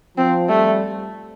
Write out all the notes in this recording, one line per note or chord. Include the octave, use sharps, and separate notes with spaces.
F3 C4
G3 A3